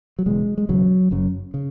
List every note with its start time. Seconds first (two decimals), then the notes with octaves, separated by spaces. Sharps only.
0.19 F#3
0.26 E1 E2 C#3 G#3
0.58 G#3
0.69 E1 E2 C#3 F#3
1.11 F#1 F#2 C#3
1.54 C#3